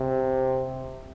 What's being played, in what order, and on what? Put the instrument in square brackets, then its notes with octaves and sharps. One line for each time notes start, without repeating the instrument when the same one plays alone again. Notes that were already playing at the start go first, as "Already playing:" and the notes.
Already playing: [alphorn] C3